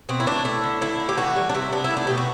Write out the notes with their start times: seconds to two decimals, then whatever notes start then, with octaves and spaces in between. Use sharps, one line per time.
0.09 B2 C4
0.20 E4
0.26 A3 D4
0.45 A3 E4
0.64 D3
0.81 D3 E4
1.00 A3
1.09 G4
1.18 E3 F#4
1.36 G3
1.49 D4
1.54 C3 E4
1.72 B3 D4
1.84 E4
1.90 A3
1.97 D4
2.07 B2 G4
2.18 F#4